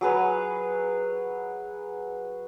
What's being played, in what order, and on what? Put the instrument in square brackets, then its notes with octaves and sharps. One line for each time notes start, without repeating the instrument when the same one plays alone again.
[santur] F#3 G#4 B4 C#5